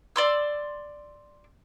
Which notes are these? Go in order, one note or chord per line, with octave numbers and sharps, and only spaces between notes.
D5 C6 E6